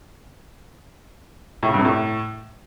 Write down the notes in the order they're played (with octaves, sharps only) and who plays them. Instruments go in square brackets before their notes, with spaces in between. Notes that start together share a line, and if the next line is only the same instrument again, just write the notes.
[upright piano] A2
C#3
G2
C3
A2